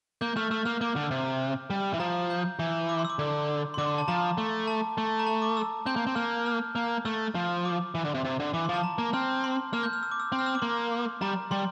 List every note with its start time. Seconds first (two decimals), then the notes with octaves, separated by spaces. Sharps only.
0.21 A#3 G6
0.36 A3 F6
0.51 A3 E6
0.65 A#3 F6
0.81 A#3 D6
0.96 D3
1.11 C3
1.70 G3
1.93 E3
2.00 F3 A#5
2.30 G6
2.59 E3
2.89 D6
2.99 C6
3.05 E6
3.10 D6
3.19 D3
3.74 C6
3.78 D3 D6
3.88 C6
3.98 A5
4.08 F3 A#5
4.38 A3
4.68 A5
4.98 A3
5.19 A#5
5.27 A5
5.42 D6
5.57 E6
5.86 C4 G6
5.96 A#3
6.07 C4
6.16 A#3 F6
6.46 F6
6.75 A#3
7.05 A3 E6
7.35 F3
7.65 D6
7.95 E3
8.04 D3
8.14 C3
8.25 C3
8.40 D3
8.54 E3 D6
8.65 C6
8.69 F3
8.74 A5
8.83 A#5
8.98 A#3 A#5
9.13 C4 F6
9.44 C6
9.73 A#3 F6
9.83 G6
9.93 F6
10.03 E6
10.11 D6
10.20 E6
10.32 C4
10.39 F6
10.46 E6
10.55 D6
10.62 A#3 C6
11.22 G3 A#5
11.51 G3 C6